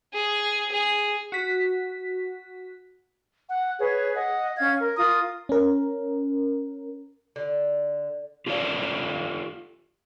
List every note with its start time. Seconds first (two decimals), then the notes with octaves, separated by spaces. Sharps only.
0.13 G#4
0.72 G#4
1.32 F#4 B6
3.49 F#5
3.78 G#4 B4 C#5
4.15 D#5 F#5
4.57 C#4 F5 G#6
4.80 A#4
4.97 F4 A#4 D#6
5.49 C#4 A#4
7.36 D3
8.46 F4 G4 A4 A#4 D5 F5